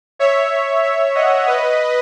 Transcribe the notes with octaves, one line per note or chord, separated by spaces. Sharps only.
C#5 E5
C#5 E5
D#5 F#5
B4 D#5